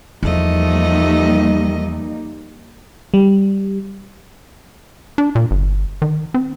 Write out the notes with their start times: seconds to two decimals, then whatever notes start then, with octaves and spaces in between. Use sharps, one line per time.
0.23 E2 F3 G3 A3 A#3 D#4 D#5
3.14 G3
5.18 D4
5.35 A#2
5.51 G1
6.02 D#3
6.34 C4